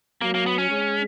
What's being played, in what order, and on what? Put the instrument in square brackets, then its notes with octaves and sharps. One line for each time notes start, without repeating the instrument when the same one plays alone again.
[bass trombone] F#3 [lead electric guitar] A#3
[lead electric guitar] A#3
B3
C#4
[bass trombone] G#3